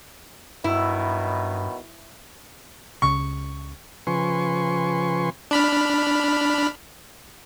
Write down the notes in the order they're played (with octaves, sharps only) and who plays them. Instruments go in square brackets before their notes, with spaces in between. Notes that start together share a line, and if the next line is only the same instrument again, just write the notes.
[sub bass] G2 [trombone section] B2 D#3 F#3 [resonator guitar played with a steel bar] E4
[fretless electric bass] C#2 C#3 [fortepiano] C#6
[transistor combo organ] C#3 F3 B4 G#5 C6 C#6
[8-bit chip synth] D4 B5 F6